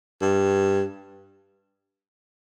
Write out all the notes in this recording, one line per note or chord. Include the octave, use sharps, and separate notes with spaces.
G2